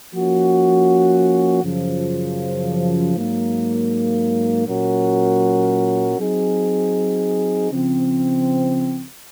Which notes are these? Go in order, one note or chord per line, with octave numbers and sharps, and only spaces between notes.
F3 A#3 C#4 F#4
F#2 C#3 F3
G#2 F#3 A#3
A#2 F#3 C#4 F#4 A#4
F#3 C4 D#4 G#4
C#3 F3 C4